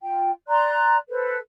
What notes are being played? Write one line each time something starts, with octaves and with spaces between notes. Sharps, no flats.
F4 G5
D5 A#5 C6 F#6
A4 B4 C5